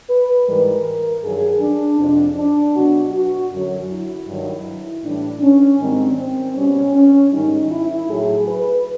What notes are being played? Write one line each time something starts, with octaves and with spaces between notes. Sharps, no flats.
B4
G#2 E3 G3 A#4
G2 D#3 F#3 G#4
D4
F2 C3 F3 D4
D4
B2 F#3 F#4
F#4
F#2 D3 F#3
E4
G2 D#3 F#3
A2 E3 G3 D4
C#4
G#2 D#3 G3 C4
C4
B2 G3 C#4
C#4
G#2 D#3 G3 D#4
E4
A2 F#3 G#4
B4